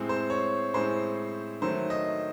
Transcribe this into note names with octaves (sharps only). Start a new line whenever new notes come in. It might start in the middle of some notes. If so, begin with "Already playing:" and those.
Already playing: A2 G#3 C4
C5
C#5
A2 G#3 C4 C5
D#3 F#3 A3 C5
D#5